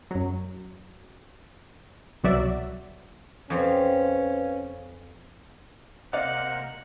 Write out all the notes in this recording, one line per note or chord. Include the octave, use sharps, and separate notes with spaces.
F#2 F#3
C2 B2 F#3 F#4 D5 E5
F2 C4 C#4 B4 F5
C3 A#3 D5 D#5 F5 F#5